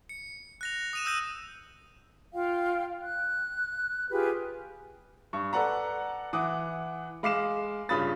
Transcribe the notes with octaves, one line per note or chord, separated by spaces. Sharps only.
C#7
F#6 A#6 F7
D#6 D#7 E7
D#6 E6 G6 A#6 D#7
F4 F5 G5
F#6
F4 G4 G#4 B4
G2 C#6
A4 B4 D5 F#5 A#5
E3 F#5 D6 D#6
G#3 F5 D6 C7 E7
G2 C#3 F4 B5 D#6 A6